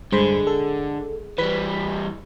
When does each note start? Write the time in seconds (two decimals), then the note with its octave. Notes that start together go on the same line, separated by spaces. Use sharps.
0.12 G2 D3 G#3 C5 B5
0.47 A4
1.38 E3 G3 B4 B6